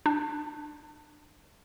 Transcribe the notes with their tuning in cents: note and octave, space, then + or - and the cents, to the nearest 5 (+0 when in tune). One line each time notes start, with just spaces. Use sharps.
D4 +30